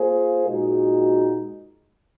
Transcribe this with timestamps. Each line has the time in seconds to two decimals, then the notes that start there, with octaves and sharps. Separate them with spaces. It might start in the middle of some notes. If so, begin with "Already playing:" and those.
Already playing: A#3 F4 G#4 C5
0.46 A#2 G#3 D#4 F#4